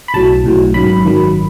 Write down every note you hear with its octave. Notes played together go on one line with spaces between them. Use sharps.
B5
B1 A2 F#3 A5
B1 A2 F#3
G#1 F#2 D#3 F#3 B5
G#1 F#2 D#3 F#3